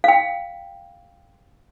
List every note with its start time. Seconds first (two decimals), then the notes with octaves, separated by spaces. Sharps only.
0.04 F5 G5